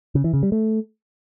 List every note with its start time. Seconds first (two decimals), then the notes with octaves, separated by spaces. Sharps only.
0.15 C#3
0.24 E3
0.33 C#3
0.43 G3
0.52 A3